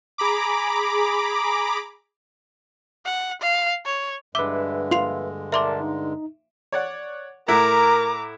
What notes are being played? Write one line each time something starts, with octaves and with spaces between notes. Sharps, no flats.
G#4 A#5 B5 D6
F#5
F5
C#5
G2 D3 G#3 B4 E5 D6
F4 C6 C7 F7
A#4 D5 E5 A5 C6 D6
D#4
C#5 D5 F#5
A2 E4 A#4 F#5 A#5 D6